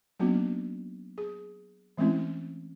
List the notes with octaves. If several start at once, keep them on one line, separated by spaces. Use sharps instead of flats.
F#3 A#3 B3 C#4 D4 F#4
G#4
E3 G#3 A3 C4 C#4 E4